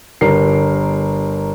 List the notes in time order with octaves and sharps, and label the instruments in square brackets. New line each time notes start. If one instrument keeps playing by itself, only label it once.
[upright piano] G1 A#4 C7